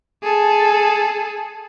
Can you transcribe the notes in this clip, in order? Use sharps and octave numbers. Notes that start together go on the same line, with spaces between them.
G#4 A4